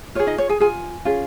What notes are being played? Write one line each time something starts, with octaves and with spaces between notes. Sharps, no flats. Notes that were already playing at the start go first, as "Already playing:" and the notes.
F4 G#4 C#5
D#4 D#5
C#5
G#4 G#5
F4 G#4 G#5
C#4 F4 G#4